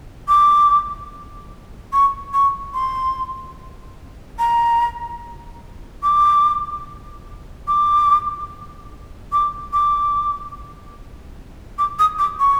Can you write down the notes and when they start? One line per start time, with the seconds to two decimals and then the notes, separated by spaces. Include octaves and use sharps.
0.28 D6
1.93 C#6
2.34 C#6
2.74 C6
4.39 A#5
6.03 D6
7.68 D6
9.32 D6
9.73 D6
11.78 D6
11.99 D#6
12.19 D6
12.40 C#6